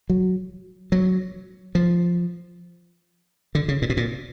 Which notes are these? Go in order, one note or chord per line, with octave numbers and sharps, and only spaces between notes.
F#3
F#3
F3
D3
C#3
A#2
B2
A#2